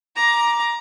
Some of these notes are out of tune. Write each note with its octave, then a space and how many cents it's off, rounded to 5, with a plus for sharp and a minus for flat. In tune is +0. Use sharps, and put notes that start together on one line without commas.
A#5 +15 D6 +0